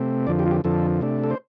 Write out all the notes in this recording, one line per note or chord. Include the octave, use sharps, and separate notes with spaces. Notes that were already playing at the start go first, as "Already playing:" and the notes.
Already playing: C3 A3 C4
F2 D3 F3 D5
G4
F4
G4
F2 D3 F3 A4
C3 A3 D4
A4
C5